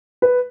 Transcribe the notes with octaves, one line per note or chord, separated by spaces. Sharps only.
B4